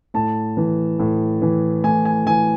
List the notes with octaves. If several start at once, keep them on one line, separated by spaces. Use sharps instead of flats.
A2 A5
E3
A2
E3
A2 G#5
G#5
E3 G#5